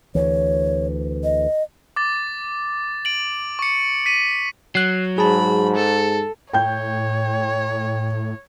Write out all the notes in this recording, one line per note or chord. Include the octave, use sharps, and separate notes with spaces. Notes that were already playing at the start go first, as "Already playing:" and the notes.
D2 E3 C#5
D#5
D6 A6
D7 F#7
C#6 C#7
B6 D#7
F#3 F#6 C7
G#2 G#4 A5 B5
A4
A2 C#5 G5 G6